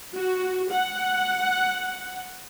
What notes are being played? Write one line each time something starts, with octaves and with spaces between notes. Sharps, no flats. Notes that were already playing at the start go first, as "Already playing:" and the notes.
F#4
F#5